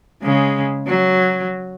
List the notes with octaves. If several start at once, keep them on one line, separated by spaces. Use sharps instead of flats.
C#3 G#3
F#3